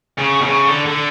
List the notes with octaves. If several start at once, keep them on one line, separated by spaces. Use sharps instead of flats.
C#3
B2
C#3
D3
D3